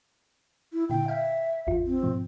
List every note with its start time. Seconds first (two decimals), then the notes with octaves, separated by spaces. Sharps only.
0.73 E4
0.90 A#2 D3 E4 G5
1.08 E5 F5 G5
1.67 G#1 E2 F4
1.86 C4
2.03 G#2 B2 F3